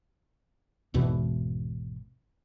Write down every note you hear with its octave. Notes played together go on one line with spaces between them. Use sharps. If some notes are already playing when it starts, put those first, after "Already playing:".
G#1 E2 B2 E3